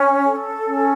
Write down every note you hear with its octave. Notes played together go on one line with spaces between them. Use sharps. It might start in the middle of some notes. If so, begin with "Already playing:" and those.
Already playing: C#4
A4
C#4